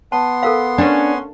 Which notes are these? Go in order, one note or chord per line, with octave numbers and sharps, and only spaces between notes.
B3 A5 C6
A4 A#4 F5
C#4 D4